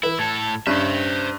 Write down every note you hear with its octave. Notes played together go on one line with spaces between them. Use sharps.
E3 E4 B4
A2 A4 A5 G#6
G2 C#4 C5 E5